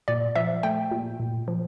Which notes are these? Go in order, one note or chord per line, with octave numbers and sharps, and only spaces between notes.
A#2 D5
F3 E5
A3 G5
A#2
A#2
F3